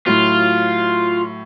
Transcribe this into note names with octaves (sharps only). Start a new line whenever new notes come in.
A2 F#3 F4